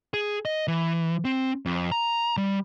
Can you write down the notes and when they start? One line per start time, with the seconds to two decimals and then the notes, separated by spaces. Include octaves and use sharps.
0.14 G#4
0.45 D#5
0.68 E3
1.25 C4
1.66 F2
1.92 A#5
2.37 G3